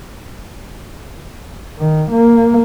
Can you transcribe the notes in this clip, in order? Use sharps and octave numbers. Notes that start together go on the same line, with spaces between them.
D#3
A#3